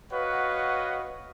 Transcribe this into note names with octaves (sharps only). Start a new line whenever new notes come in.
F#4 B4 C#5 D#5 F5 F#5